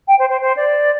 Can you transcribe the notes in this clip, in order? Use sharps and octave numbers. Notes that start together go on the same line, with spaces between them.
G5
C5
C5
C5
D5